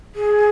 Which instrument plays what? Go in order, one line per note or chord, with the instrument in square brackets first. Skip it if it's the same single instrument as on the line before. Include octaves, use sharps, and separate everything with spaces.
[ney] G#4